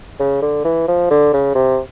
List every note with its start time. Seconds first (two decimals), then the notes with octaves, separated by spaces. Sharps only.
0.20 C#3
0.42 D3
0.65 E3
0.88 F3
1.11 D3
1.33 C#3
1.55 C3